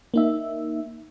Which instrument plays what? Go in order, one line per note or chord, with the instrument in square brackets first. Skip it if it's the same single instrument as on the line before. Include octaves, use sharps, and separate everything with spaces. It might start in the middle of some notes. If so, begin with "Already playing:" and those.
[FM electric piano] A#3 D#4 E5